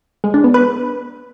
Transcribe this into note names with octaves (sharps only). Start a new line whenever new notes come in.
G#3
D4
B3
B4